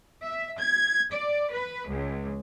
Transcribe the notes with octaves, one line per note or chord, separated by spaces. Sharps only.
E5
G#6
D5
B4
C#2